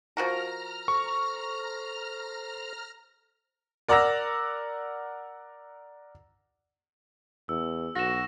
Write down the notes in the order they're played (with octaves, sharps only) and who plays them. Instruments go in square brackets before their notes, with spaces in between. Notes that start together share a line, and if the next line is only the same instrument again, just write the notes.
[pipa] F3 F#4 A#4 [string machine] A#5 F6
[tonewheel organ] A4 C5 [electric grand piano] C#6
[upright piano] A#4 D5 F#5 A#5 E6 A#6
[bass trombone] E2 [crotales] E6
[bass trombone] B1 [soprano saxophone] F#4 [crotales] A#6 E7